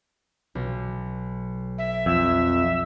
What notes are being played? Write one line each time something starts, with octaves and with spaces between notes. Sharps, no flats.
B1
E5
F2 E6